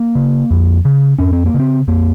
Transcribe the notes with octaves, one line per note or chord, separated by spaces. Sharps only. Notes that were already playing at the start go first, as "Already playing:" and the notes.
Already playing: A#3
C#3
F2
C#3
F2 C#4
C4
A#3
C#3
C4
F2 A#3